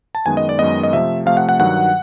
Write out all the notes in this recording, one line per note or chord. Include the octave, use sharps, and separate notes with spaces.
A5
F#2 D#3 G#3 B3 G#5
D#5
D5
F#2 D#3 G#3 B3 D#5
D#5
C3 F3 A3 E5
C3 F3 A3 F5
F#5
F#5
G2 D#3 F#3 F#5